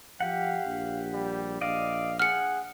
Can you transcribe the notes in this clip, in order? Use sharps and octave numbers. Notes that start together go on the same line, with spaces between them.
F3 G4 F5 F#5
A#1
G3
A#1 D5 D#5 F5
G#4 F#5 F6 C#7